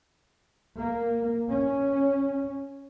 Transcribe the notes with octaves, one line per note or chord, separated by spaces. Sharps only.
A#3
C#4